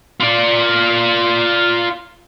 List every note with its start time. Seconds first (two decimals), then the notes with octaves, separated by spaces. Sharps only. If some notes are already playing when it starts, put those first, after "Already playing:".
0.20 F4 D5